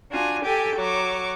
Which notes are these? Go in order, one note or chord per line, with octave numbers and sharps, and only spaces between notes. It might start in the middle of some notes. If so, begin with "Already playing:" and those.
D4 F4 F#4 G#5
G4 A4 G5 G#5
F#3 C#6 D6